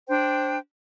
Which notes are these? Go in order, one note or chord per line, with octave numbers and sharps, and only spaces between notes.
D4 C5 G5